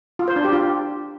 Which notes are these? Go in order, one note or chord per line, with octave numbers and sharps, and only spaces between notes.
F4
C5
D4
G4
F4